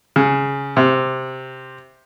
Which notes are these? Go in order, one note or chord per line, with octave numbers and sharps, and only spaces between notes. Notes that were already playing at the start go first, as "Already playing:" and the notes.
C#3
C3